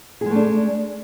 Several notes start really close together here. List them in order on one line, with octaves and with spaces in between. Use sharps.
G#4 G#3 A3 D4